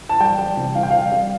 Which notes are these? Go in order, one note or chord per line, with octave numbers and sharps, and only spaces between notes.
A5
G3 G5
G3
C3
C3 F5
G5
G3 F5
G3